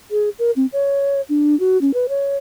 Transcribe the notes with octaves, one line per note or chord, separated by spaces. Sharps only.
G#4
A#4
C4
C#5
D4
F#4
C#4
B4
C#5